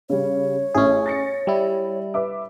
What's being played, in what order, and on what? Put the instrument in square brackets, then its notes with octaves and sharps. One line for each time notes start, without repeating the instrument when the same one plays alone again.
[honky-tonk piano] C#3 G3 [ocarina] C#5
[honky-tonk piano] A1 A3 E4 [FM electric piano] C#4 G#4
[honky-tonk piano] A6 A#6 C#7
[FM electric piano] G3 E4
[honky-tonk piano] B4 E5 D6